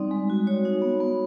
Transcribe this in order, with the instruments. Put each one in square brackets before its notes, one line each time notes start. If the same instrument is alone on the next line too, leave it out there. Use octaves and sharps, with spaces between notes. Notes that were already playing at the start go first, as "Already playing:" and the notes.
Already playing: [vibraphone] G3 C4 D#4 D5
G#3
F#4
F#4 C#5
D#4
B3
B3